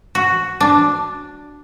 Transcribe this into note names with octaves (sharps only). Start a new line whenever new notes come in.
F#4
D4